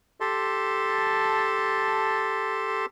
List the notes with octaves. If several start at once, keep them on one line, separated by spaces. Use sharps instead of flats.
G4 A4 A5 C6